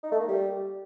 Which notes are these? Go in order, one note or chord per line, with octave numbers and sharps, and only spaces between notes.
D#4
A3
A#3
G3